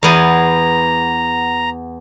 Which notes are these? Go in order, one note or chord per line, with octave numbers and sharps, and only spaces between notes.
E2 B3 G#5 A#5